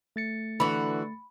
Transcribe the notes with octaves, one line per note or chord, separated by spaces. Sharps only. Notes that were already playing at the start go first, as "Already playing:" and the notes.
A3 A6 C#7
D3 E3 F#4 B5